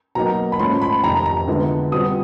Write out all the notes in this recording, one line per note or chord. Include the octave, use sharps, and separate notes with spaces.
B2 F#3 A#3 D#4 A#5
B5
G#2 F3 A3 C#4 C6
B5
F2 C3 D#3 A#5
A#5
D3 F3 G#3 B3 E4
B2 G3 C4 F4 D#6